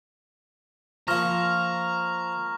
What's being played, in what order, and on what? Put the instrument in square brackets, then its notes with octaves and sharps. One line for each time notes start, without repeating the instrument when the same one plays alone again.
[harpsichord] F3 A#3 [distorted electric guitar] A#5 [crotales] C#6 F6 A#6